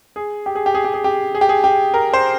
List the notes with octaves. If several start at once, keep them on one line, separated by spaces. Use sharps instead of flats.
G#4
G4
G#4
G4
G#4
G4
G#4
G4
G#4
G4
G#4
G4
A#4
C5